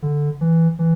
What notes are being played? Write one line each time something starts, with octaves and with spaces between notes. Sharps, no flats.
D3
E3
E3